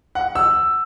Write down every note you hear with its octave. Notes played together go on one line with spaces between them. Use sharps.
F#5
E6